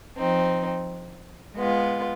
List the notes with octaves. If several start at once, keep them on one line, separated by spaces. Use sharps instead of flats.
F3 C4 D#4
G#3 B3 F4